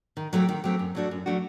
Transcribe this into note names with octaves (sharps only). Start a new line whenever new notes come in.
D#3
F#3 A3 C4 G4
D#3
F#3 A3 C4 G4
F#2
F#3 A3 D4 F#4
F#2
F#3 A3 D4 F#4